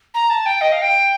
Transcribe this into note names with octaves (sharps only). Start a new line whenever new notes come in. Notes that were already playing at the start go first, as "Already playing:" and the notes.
A#5
A5
G5
D#5
F5
G5